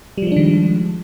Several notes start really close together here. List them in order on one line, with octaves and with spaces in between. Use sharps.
G3 F3 G#3 D4 D#3